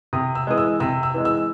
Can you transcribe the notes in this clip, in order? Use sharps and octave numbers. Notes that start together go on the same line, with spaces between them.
C3 D#6
E6
E3 G#3 D#6
E6
C3 E6
E6
E3 G#3
E6